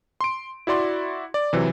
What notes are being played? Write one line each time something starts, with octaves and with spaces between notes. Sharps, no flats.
C6 D7
E4 F#4 D5 C6
D5
C3 E3 F#3